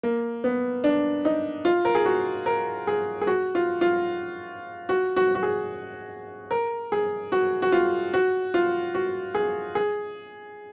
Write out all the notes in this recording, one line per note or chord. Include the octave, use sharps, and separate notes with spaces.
A#3
B3
D4
D#4
F4
A#4
G#4
F#4
A#4
G#4
G#4
F#4
F4
F4
F#4
F#4
F#4
G#4
A#4
G#4
F#4
F#4
F4
F#4
F4
F#4
G#4
G#4